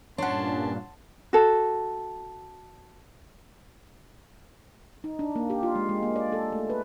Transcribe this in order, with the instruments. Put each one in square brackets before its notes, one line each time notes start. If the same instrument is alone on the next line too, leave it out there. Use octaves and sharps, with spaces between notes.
[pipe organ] G2 A#2 [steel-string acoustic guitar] C#4 D4 [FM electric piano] C#5 F#5 [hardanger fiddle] A5 C6
[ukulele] F#4 A4
[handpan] D#4
D4
A#3
G4
F4
G#3
G#3
A#3
D5
A4
A3
B4